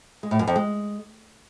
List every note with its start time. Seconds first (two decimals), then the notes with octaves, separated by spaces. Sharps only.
0.23 G#3
0.31 A2
0.39 F#2
0.48 F2
0.56 G#3